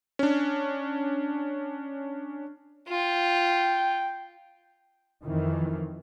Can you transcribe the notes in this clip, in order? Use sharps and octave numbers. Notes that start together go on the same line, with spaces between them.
C#4 D4
F4 G5
F2 D#3 E3